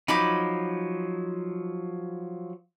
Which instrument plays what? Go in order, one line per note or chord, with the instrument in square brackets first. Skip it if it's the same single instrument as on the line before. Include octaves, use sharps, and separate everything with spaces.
[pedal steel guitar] F3 F#3 [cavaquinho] D#4 B5 D6